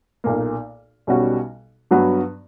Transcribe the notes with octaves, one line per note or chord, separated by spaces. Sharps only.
B1 A#2 A#3
B1 B2 G3 C#4 F#4
G2 F#3 B3 F#4